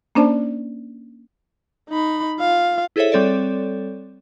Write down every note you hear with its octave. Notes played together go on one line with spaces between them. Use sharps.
A#3 C#4 D4 C5 D5 A5
D#4 B5
F4 F5
E4 G#4 A4 C5 C#5 E5
G3 C4 A4 C#5 D5